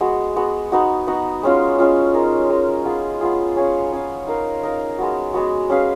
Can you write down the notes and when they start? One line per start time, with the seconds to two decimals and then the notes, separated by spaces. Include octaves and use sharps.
0.01 G#3 B3 F#4
0.36 G#3 B3 F#4
0.72 B3 D#4 F#4
1.07 B3 D#4 F#4
1.43 G#3 C#4 F4
1.79 G#3 C#4 F4
2.14 G#3 D#4 A#4
2.50 G#3 D#4 A#4
2.85 B3 F4 G#4
3.21 B3 F4 G#4
3.56 C#4 G#4 C#5 F5
3.92 C#4 G#4 C#5 F5
4.27 D#4 A#4 F5
4.63 D#4 A#4 F5
4.99 G#3 B3 F#4
5.34 G#3 B3 F#4
5.70 C#4 G#4 B4 F5